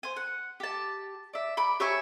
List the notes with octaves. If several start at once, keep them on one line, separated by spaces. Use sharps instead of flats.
C5 G#5
F#5
G4 A5
D5 E5
B5 D6
G4 C#5 E5 G#5